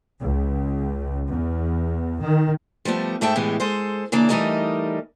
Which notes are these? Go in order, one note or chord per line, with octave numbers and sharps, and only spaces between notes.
C#2
E2
D#3
F3 G3 A3 B3
G#2 A3 E5 G5 A5
E2 A2 E3 G#3 B3 G4
G#3 A4 C5
C#3 E3 A#3 D4
E3 G3 A3 D#4 A#4 D#5